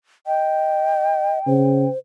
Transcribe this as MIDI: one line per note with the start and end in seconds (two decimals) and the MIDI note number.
0.27 1.39 75
0.27 1.89 79
1.47 1.86 49
1.47 1.98 72